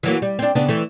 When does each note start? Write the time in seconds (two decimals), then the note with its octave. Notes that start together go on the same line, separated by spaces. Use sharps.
0.03 E3 F#3 A#3
0.22 G3
0.39 C4 D4
0.55 C#3 B3 D4
0.68 E3 A3